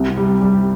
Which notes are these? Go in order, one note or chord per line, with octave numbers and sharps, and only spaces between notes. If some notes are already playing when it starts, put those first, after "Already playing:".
Already playing: C2
G3
G3